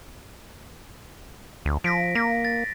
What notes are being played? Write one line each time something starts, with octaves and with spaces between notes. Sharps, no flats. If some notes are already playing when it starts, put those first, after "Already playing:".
D2
F3 A#6 B6 D7
A#3 A#6
A6